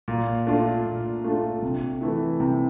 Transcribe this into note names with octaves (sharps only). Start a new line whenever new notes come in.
A#2
A3 D4 F4
A#2
A3 D4 F4
C3
E3 A3 E4
C3